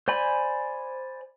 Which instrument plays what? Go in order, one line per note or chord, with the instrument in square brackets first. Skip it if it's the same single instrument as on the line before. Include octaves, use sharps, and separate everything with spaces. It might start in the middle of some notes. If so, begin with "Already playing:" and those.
[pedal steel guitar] C5 D5 G#5 B5